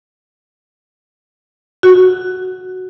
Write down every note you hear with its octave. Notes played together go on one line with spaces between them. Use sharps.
F#4